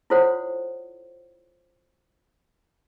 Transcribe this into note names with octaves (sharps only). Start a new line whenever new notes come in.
E4 F4 A4 C5 C#5 F#5